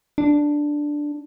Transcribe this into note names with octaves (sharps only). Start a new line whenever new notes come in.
D4